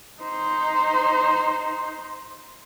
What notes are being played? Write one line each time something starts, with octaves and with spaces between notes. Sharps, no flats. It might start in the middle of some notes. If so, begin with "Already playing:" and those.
D#4 C5